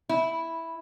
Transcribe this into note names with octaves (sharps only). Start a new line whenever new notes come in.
E4